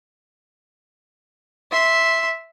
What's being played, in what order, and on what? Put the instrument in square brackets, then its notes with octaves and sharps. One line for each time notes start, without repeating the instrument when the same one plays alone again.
[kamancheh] E5 C6